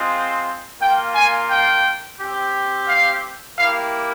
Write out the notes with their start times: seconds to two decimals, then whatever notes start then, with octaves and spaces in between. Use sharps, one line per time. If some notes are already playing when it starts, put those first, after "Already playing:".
Already playing: G#3 C4 F4
0.79 A#3 F4 G5
1.14 G#5
1.50 G5
2.19 C4 G4
2.88 F5
3.57 A#3 E4 G4 F5